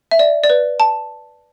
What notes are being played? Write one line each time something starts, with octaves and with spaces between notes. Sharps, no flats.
E5
D5
D5
B4
A5